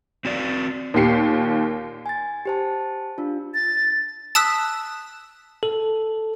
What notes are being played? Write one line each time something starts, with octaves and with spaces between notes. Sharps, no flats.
C4 F#4 D5
D#2 A#2 G4 C7 C#7
G#5 A6
G4 C5 A5
D4 F4
A6
A5 D#6 E6 F#6 B6
A4